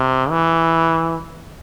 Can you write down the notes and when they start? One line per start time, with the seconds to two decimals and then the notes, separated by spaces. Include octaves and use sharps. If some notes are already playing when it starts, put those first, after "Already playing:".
Already playing: C3
0.30 E3